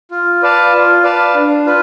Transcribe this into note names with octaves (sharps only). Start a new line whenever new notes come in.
F4
B4 D5 F5 A5
F4
B4 D5 F5 A5
D4
F4 B4